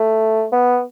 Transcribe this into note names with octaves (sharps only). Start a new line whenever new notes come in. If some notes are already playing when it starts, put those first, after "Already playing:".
Already playing: A3
B3